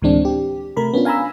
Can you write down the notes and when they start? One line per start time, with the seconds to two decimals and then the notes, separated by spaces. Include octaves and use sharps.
0.02 D2 A2 E3 G#3 C4 D4
0.25 G4
0.77 C3 A3 A#4 B5
0.94 B3 C#4 D4 F4
1.05 F5 G#5 A#5 B5 E6